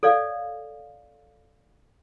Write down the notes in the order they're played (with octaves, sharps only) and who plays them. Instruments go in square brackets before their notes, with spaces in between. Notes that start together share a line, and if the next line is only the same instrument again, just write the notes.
[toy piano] A4 C#5 D5 F5